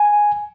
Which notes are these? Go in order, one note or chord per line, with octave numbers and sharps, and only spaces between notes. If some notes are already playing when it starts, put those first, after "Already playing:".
Already playing: G#5